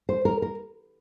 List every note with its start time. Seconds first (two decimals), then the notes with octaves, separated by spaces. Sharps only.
0.09 C5
0.25 A#4
0.42 A#4